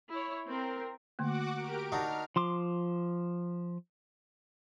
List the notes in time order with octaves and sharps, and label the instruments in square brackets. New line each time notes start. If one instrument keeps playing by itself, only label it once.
[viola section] E4 C#5
C4 A#4
[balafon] D3 A3 A#3 [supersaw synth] F#4 F#5 D6
[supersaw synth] G4 A#4 D7
[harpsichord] D4 D#4 F#4 [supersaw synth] F6
[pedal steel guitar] F3 C6 D6